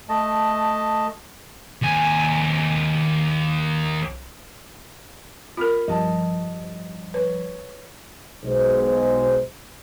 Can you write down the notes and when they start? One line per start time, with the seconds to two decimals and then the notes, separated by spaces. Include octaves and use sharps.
0.09 A3 D#5 A5
1.82 D#2 G#5
5.57 F4 A#4 B5 F6
5.88 G2 F3 G3 D#5 A5
7.14 B4 C#5
8.44 B1 B2 G#3 C5